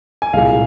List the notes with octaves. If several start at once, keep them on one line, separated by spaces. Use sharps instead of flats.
G#5
C2 A#2 G#3 F5